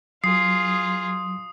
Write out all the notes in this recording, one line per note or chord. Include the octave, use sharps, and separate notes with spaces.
F#3 F4 G#4 D#6 C7